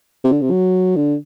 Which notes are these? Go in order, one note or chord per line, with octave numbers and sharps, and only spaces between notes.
C3
D3
C3
F#3
D3